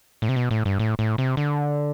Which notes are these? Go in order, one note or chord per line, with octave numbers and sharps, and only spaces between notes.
A2
C3
B2
A2
G2
A2
A2
C3
D3